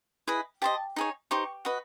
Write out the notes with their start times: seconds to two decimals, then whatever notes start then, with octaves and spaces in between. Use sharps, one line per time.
0.27 E4 G#4 B4 D#5
0.62 G4 C5 D#5 A5
0.96 D#4 G#4 C#5
1.31 D#4 G4 C5 C#6
1.65 F#4 B4 D#5